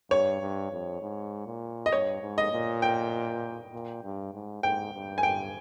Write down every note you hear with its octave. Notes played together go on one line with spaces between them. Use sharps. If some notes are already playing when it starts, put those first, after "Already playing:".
G2 C#5
G2
F2
G#2
A#2
D#5
G2 C#5
G#2
D#5
A#2
G5
A#2
G2
G#2
G#2 G5
G2
G#5
G2 G5